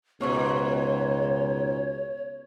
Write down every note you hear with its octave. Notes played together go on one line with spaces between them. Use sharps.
C#2 G#2 B2 B3 C#5 C#6